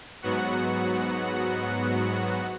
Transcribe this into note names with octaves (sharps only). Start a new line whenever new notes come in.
G#2 F#3 B3 F#4 F#5